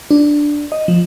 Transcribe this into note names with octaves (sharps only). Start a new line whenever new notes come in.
D4
D#5
F3